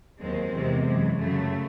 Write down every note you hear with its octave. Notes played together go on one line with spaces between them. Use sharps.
D#2 D#3 F#3 G#3 C4
E2 C3 D#3 G#3
F#2 E3 G#3
F#2 C#3 F#3 A3